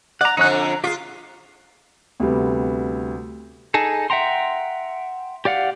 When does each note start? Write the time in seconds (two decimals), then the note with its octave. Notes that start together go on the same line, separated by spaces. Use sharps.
0.21 D5 F#5 A#5
0.37 F2 D3 D#4 C#5 F#6
0.51 A#5
0.84 F4 G4 G#4
2.20 D2 C3 G3 B3
3.74 D#4 G#4 A4
4.10 E5 F#5 G5 A#5 C6
5.45 G4 D5 F5 F#5